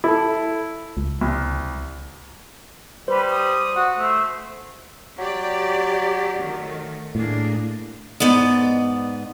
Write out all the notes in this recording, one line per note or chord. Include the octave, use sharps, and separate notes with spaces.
E4 A4
C#2
C2
G3 B4 C5
D#6
F#4
A3 C5
F#3 G4 D5
D#3 A3
A2 A#3 D4 G#4
G#2 B3 D5 D#5